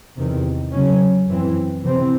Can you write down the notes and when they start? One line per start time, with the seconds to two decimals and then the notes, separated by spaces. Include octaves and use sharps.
0.17 E2 C3 D#3
0.71 C#3 F#3 C#4
1.27 F#2 E3 C4
1.82 C3 E3 C4